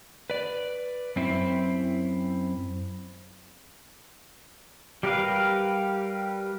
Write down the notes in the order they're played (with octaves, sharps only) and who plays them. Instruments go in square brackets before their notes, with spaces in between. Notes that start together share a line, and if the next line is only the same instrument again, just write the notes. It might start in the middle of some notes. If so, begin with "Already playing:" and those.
[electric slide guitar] B4 D5
F#2 C4 E4
[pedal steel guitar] G3 G4 A#4 B4 F5